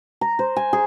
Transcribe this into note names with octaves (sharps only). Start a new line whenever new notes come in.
A#5
C5
G#5
G#4